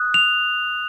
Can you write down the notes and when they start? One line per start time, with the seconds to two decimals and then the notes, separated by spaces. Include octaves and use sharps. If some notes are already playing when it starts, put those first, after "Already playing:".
Already playing: D#6 F#6
0.14 F7